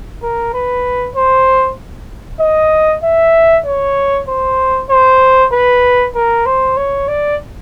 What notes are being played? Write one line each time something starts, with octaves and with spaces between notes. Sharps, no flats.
A#4
B4
C5
D#5
E5
C#5
C5
C5
B4
A#4
C5
C#5
D5